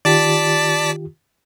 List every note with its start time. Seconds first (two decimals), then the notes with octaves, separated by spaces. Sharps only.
0.05 D#3 F4 G4 D5 A5 B6